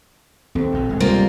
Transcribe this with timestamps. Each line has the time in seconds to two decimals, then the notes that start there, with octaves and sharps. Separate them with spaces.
0.55 D#2 C4 A4
0.72 A#1 B2
0.89 D1 G#3
1.00 C3 G3 A#3 F4 C5